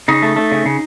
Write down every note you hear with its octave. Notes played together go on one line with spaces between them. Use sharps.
C#3 D#4
A3
A3
C#3
C#3